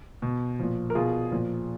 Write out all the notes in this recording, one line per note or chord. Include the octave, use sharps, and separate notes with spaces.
B2
A#2 F3
A#4
B2 F4 G#4
A#2 F3